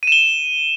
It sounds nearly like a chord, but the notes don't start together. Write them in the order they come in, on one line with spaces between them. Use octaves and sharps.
D#7 E7 G7